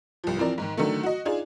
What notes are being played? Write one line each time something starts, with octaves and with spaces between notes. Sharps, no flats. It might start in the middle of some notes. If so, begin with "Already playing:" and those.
C2 F3
E3 F3 C4 A#4 D5
G#2 D#3
D3 D#3 F#3 A3
F#4 D#5
D4 D#4 F4 G#4